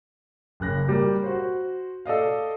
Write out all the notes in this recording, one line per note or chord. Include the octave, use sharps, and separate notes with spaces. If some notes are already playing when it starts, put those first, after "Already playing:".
F#1 C#3 F#6 A#6
G3 G4 A#4
F#4 C5
A4 D5 D#5 F5